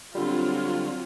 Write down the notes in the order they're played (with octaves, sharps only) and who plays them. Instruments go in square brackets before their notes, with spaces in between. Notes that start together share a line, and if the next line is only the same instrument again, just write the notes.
[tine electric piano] D3 G3 [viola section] F#3 C4 F4